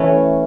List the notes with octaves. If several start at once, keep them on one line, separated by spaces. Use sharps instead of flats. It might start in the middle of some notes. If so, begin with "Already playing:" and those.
Already playing: E3 A3 C#4